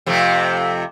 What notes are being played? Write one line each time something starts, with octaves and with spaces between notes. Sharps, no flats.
F2 C3 A3